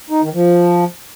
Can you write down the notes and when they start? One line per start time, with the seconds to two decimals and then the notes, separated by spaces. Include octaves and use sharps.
0.10 D#4
0.22 D#3
0.34 F3